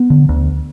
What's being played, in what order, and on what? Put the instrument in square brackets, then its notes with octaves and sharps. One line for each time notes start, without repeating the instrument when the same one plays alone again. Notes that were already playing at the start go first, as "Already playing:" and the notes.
Already playing: [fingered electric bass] B3
D3
D2